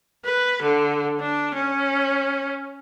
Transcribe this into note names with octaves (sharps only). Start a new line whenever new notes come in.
B4
D3
D4
C#4